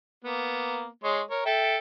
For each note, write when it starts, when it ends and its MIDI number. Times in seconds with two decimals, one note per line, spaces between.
0.24 0.86 58
0.24 0.86 59
1.04 1.20 56
1.04 1.20 73
1.04 1.20 84
1.30 1.43 70
1.30 1.43 73
1.45 1.77 69
1.45 1.77 76
1.45 1.77 79